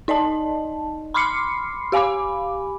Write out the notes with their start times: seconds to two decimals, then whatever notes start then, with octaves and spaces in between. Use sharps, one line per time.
0.08 D#4 D5 D#5 A5
1.14 B5 C6 D6 F6 C7 C#7
1.92 G4 F5 G#5 B5 D6